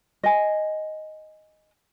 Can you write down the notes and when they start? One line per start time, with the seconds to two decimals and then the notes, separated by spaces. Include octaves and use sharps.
0.24 D#5 G#5